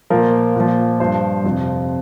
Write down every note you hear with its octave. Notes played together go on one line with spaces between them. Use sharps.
A#2 F3 A#4
A#2 F3
G2 F3 C5
F2 C3 F3